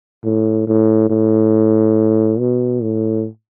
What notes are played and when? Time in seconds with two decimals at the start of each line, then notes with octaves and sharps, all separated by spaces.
0.24 A2
0.67 A2
1.10 A2
2.39 B2
2.82 A2